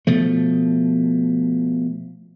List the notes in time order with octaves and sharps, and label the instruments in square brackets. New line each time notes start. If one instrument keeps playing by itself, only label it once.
[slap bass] B2 F3 A3